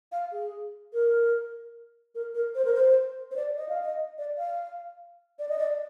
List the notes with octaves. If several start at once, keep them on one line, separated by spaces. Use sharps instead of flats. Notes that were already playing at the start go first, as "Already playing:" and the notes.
F5
G#4
A#4
A#4
A#4
C5
A#4
C5
C5
D5
D#5
F5
D#5
D5
F5
D5
D#5
D5